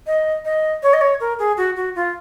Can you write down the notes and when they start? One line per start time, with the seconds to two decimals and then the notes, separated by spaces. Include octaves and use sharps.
0.07 D#5
0.45 D#5
0.83 C#5
0.93 D#5
1.01 C#5
1.20 A#4
1.39 G#4
1.57 F#4
1.76 F#4
1.96 F4